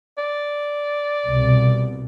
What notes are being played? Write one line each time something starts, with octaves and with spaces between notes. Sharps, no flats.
D5
C2 B2